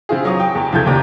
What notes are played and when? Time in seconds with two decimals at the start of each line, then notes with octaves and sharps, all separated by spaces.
0.09 E3 C4 E4 F4 G#4
0.25 F#3 D#6
0.40 G5
0.55 E2
0.72 C2 E3 F3 A4 G6 G#6
0.86 F#1 D#2 D4 G4 A#5